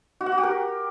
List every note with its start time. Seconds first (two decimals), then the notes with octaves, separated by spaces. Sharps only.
0.21 F#4
0.26 F#5
0.32 F#4
0.38 G4
0.43 A#4